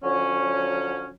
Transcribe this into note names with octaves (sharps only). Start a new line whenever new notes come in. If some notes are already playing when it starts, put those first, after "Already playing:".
D3 F3 F#3 C#4